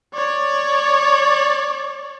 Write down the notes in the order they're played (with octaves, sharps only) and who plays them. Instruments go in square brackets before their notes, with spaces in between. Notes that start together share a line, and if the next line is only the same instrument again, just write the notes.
[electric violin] C#5 D5